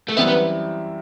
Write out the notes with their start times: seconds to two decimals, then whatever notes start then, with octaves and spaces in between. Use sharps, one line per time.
0.09 A3
0.17 F#2 E3 G3 B3 C4 E4
0.28 B3